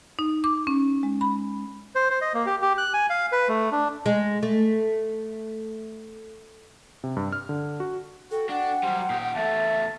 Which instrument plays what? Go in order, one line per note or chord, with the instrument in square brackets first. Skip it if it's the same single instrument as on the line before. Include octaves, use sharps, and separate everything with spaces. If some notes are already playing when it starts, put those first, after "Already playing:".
[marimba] D#4
D6
C#4
G#3
B5
[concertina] C5
C5
D#5
A#3
G4
G4
F#6
G#5
F5
B4
A3
D4
[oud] G#3
A3
[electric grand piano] C3
G2
F6
D3
F#4
[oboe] F#4 [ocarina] A4 [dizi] G5
[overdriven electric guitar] D4 [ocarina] F#5
[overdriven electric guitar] F#3 G3 [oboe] C5
[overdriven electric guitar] A#2 G4 [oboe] D#4
[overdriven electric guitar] E2 A3 [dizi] E5 [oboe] A5